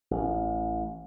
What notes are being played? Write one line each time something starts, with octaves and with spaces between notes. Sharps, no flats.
A1